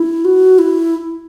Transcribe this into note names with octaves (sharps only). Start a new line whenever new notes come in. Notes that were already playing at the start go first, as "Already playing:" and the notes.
Already playing: E4
F#4
E4